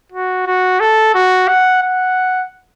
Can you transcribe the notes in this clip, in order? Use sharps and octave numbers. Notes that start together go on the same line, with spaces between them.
F#4
F#4
A4
F#4
F#5
F#5